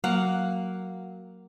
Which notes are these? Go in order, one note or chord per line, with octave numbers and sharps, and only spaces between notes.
F#3 A#3 F5 F#5